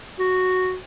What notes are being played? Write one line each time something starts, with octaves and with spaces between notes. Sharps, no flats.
F#4